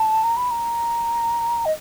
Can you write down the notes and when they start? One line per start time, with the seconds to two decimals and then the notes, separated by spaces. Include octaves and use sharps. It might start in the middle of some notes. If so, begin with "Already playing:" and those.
Already playing: A5
0.23 A#5
0.37 B5
0.51 A#5
1.65 D#5